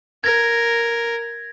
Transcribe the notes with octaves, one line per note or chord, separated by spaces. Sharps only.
A#4 G#6 A#6